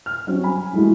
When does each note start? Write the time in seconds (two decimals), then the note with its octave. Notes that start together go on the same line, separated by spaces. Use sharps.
0.06 F6
0.27 F#3 C4 C#4 F#4
0.43 G#5 B5
0.73 E3 F3 G#3 A3 E4 F#4